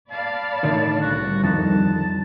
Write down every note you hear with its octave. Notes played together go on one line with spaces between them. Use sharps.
D5 F5 A5 B5
A2 D3 D#3
C2 F#4
F2 D3 D#3 A5